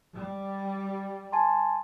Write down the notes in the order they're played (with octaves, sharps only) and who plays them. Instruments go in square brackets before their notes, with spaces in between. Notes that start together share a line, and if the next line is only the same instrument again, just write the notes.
[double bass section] G3
[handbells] G#5 A5 C6